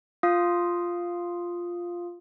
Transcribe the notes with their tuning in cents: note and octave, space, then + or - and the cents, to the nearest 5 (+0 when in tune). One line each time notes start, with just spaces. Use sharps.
F4 +0 F5 +0 D#6 +0